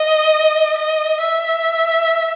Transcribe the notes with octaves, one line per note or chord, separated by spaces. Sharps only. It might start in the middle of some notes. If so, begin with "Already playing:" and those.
Already playing: D#5
D#5
E5